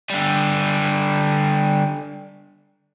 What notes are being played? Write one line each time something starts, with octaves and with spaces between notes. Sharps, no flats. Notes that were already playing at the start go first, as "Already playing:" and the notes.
D3 G3